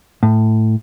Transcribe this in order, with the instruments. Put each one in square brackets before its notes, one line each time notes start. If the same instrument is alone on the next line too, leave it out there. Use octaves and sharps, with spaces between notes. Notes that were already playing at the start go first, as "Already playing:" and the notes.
[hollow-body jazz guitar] A2